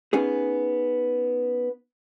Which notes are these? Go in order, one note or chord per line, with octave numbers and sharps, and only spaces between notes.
B3 C#4 D#4 G#4